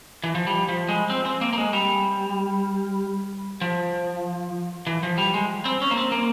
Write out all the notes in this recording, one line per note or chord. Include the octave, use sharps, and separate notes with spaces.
E3
F3
G3
F3
G#3
C4
C4
A#3
A#3
G#3
G3
F3
E3
F3
G3
G#3
C4
C#4
A#3
C4
A#3